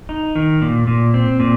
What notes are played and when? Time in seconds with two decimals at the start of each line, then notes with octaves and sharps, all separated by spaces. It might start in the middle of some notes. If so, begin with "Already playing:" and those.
0.09 D#4
0.36 D#3
0.62 A#2
0.87 A#2
1.14 C4
1.40 A#2